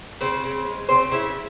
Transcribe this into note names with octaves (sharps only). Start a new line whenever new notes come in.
C#3 C4 C5
C#3
G#3
C#3 C4 C5
C#3 E4 E5